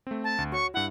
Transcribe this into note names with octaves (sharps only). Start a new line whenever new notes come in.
A3 C4
A5
D2
F#4 C#5 C#6
G2 E4 F#5